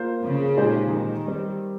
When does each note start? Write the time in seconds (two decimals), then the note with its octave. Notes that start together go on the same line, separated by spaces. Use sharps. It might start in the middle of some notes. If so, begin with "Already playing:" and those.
Already playing: A#3 F4 C5
0.24 C#3
0.57 A#2 G#3 D#4 G4 C5
0.92 D#3
1.26 G3 C4 G4